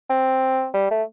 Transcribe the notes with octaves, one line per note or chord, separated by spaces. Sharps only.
C4
G3
A3